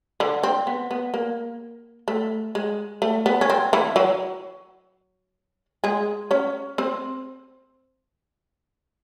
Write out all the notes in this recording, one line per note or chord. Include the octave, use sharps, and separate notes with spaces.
D3 D4
C4
B3
B3
A#3
A3
G#3
A3
B3
C#4
C4
E3 E4
F#3 F#4
G#3 G#4
C#4 C#5
C4 C5